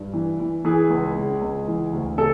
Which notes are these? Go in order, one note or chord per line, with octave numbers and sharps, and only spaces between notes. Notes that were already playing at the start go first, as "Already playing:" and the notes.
Already playing: G2
E3
E3
E3 G#4
C#2
C#3
C#2
E3
D2
C#3 A4